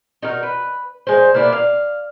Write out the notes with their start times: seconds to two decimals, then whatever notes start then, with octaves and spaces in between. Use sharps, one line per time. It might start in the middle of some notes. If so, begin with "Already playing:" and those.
0.23 D#4 F#4 A#4
0.43 B4
1.07 G#3 C5
1.34 A#3 B3 E4 D5
1.53 F5